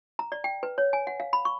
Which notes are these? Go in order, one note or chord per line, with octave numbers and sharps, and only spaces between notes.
A#5
D5
G5
B4
C#5
G#5
F#5
F5
B5
C#6